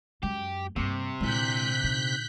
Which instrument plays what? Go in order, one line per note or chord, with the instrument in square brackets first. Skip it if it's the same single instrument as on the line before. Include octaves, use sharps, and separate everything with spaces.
[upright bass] F#2 G#3 [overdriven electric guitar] G4
[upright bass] G2 A#3 [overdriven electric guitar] C3 [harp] C#6 D6 C7
[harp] A#2 D3 [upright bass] G#3 E4 [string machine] F#6 G6 B6
[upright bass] D#4